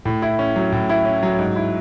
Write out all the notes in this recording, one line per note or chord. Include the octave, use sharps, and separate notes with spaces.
A2
E4
C#4
F#3
A2
E4
C#4
F#3
G#2
E4